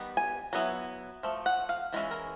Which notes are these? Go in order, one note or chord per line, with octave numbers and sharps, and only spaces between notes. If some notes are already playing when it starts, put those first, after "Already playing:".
Already playing: D#3 G3 B3
G#5
F#3 B3 E4
F3 A3
F#5
F5
E3 G#3 C#4 E4
A#4